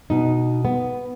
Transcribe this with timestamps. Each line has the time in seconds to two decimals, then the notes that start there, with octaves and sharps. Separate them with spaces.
0.10 B2 D#4
0.65 B3